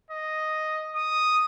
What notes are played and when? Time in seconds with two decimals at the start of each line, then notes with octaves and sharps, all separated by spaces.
0.10 D#5
0.96 D#6